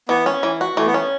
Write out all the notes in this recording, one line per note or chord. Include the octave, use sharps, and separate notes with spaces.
E3 B3
C#4
E3
F#4
E3 A3
B3
C#4